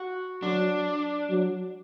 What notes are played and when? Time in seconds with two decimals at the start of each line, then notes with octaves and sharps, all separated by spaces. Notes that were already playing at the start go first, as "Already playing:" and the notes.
Already playing: F#4
0.42 F#3 D4
1.29 F#3